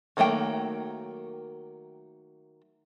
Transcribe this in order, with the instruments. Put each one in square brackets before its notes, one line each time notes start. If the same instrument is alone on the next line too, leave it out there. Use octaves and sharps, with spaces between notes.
[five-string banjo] D#3 F#3 A3 A#3 G5